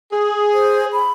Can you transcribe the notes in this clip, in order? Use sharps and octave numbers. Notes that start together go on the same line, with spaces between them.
G#4
C5
B5